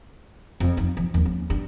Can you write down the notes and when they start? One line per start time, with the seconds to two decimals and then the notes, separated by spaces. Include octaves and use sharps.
0.60 F2
0.77 D#4
0.97 F3
1.14 D#2
1.25 C#4
1.50 G2